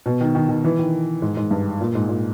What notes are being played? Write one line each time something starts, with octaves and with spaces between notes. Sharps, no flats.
B2
D#3
D#3
D#3
E3
D#3
G#2
G#2
G2
A#2
G#2
A#2